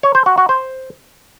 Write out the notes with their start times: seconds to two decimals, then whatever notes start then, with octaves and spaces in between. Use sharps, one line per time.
0.03 C#5
0.15 C5
0.26 F#4
0.38 F#4
0.49 C5